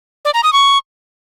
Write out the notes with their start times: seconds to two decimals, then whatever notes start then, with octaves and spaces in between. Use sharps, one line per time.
0.25 D5
0.34 A#5
0.43 D#6
0.53 C#6